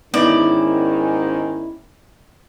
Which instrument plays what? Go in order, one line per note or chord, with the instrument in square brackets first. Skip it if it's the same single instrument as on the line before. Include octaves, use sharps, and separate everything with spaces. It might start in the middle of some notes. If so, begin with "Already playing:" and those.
[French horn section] G#2 D#3 C#4 [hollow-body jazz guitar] B3 D#4 E4 [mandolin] D5